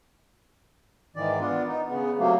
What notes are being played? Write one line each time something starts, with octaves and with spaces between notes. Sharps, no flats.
G#2 D#3 E3 D5
B3 D4 F4
D#4
C#3 B3
C3 F#3 A3 A#3